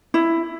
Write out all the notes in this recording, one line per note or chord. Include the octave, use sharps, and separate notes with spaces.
E4